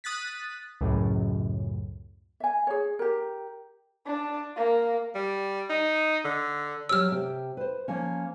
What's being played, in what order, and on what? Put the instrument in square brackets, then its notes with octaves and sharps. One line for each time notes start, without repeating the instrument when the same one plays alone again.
[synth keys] D#6 F#6 A6 B6
C#2 F#2 A2
[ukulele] E5 G#5
G#4 C#5
G4 A#4
[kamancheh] D4
A#3
[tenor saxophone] G3
D#4
D3
[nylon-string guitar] F#3 G4 C#5 [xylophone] E6 F6
[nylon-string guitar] C3 G4 G5
B4 C5
F3 A#3 C#4